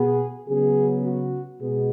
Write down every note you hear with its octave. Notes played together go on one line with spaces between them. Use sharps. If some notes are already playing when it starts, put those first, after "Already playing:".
Already playing: B2 B3 G#4
C#3 F#3 B3 G#4
F#4
B2 G#3 B3 G#4